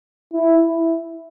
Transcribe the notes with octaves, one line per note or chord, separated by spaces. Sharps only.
E4